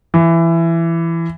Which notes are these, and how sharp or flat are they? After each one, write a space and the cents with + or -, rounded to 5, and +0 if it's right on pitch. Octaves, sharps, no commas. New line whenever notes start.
E3 +15